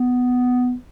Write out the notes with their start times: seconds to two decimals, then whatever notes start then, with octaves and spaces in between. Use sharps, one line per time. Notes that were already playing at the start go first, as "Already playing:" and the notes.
Already playing: B3